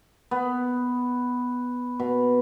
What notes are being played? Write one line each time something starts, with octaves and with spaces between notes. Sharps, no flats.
B3
B2